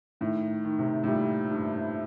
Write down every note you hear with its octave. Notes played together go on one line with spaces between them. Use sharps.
A2 D#3
D#3
C3
A2
A#2 G3
G2